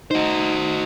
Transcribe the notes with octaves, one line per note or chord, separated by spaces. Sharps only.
D#4 F#4 C5